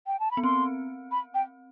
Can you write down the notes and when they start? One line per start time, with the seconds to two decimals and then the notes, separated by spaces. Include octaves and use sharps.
0.07 G5
0.20 A5
0.31 B5
0.37 B3
0.43 C4 C6
1.11 B5
1.34 G5